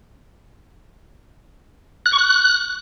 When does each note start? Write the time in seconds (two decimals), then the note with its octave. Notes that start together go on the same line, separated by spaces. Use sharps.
2.06 F#6
2.12 C#6
2.18 F#6